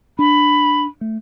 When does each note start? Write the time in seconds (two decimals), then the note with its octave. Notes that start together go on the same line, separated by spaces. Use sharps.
0.19 D4 B5
1.01 A3